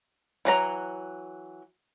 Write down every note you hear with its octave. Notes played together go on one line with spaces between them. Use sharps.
E3 F#3 A#5